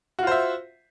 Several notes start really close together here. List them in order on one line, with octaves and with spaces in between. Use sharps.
F#4 F4 C5 E5